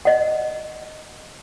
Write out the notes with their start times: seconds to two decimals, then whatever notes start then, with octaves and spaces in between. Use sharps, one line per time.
0.05 D#5 F#5